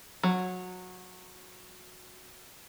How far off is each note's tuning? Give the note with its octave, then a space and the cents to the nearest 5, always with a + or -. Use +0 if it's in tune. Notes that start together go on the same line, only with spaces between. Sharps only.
F#3 -20